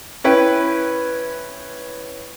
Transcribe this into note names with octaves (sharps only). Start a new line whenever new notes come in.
C#4 E4 B4 G5